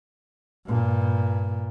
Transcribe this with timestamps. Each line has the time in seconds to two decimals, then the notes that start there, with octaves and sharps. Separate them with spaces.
0.66 G2 A#2